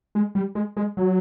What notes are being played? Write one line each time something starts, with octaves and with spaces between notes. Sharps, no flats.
G#3
G3
G#3
G#3
F#3